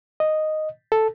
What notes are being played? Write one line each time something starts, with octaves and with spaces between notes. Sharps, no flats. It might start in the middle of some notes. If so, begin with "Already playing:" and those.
D#5
A4